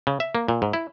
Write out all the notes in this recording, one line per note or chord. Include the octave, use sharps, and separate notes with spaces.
C#3
E5
A#3
A#2
G#2
E4